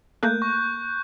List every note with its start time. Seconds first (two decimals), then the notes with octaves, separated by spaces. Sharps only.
0.23 A3 A#3 F#6 G6
0.42 C#6